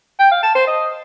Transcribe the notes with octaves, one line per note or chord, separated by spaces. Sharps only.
G5
F5
A5
C5
D#5